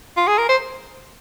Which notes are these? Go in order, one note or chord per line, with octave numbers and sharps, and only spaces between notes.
F4
G#4
A#4
C5